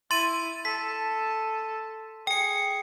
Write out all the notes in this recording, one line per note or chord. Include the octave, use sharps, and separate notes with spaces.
E4 C6 A6 D#7
A4 B6
G#4 G5 C#7